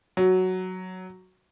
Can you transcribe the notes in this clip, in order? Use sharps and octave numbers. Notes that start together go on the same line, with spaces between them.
F#3